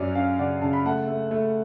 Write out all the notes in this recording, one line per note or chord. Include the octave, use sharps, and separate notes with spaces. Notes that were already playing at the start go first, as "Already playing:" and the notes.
Already playing: F#2 F#3 C#4 D5
C#4 F5
C#3 D5 F#5
C#3 A5
B5
A3 F#5 A5
A3
A3